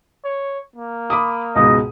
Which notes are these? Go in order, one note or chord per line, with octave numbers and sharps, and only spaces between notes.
C#5
A#3
B5 D6 D#6
C#2 G#2 B2 D#5